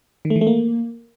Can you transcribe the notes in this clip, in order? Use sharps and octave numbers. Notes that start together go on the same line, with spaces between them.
D#3
A3
E3
A3
A#3